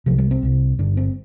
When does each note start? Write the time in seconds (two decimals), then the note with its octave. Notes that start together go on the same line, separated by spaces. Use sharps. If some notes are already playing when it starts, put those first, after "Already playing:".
0.06 C2 C3 F3
0.18 G3
0.31 C4
0.42 C2 C3
0.79 G1 G2 D3 D4
0.97 C4